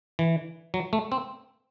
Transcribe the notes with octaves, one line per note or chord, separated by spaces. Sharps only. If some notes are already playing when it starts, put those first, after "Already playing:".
E3
F#3
A3
C4